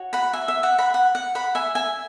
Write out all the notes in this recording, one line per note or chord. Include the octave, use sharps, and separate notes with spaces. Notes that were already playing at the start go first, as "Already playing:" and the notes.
Already playing: F#4 C#5
F#5 B5
E5 G#5
E5
F#5
F#5 B5
F#5
F#5
F#5 B5
E5 G#5
E5 G#5